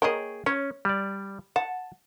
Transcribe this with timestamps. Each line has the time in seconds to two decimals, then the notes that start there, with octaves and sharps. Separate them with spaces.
0.02 A#3 G#4 C#5 D#5 G5
0.46 C#4 C#5
0.85 G3 D5
1.56 F#5 A5